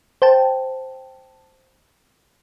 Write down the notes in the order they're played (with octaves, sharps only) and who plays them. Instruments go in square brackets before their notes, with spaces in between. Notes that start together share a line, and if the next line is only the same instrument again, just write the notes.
[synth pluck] C5 G5 A5